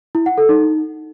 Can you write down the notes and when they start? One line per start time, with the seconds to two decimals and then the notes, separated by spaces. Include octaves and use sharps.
0.15 E4
0.26 F#5
0.38 A4
0.49 D#4